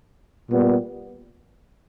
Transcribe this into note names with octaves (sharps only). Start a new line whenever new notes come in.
A#2 G3 B3